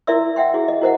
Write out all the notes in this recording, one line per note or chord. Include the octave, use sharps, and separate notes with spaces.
E4 A#4 D5 E5 C6 E6
E5 F#5 G5 C6
E4 F#4 G#4
D#5
E4 F#4 A#4 C5 D#5 F#5